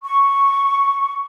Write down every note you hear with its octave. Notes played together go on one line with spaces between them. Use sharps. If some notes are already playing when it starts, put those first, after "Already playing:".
C#6